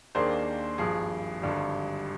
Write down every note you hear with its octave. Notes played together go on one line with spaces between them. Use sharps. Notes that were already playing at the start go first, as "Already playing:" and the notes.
D#2 D#3 A#3 D4 G#4 C5
G#1 G2 F3 G#4
G#1 G2 D3 G3